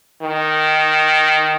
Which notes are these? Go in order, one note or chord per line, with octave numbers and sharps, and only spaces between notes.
D#3